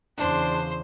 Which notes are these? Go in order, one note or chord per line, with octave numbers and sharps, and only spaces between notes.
E2 C#3 D4 C5 C6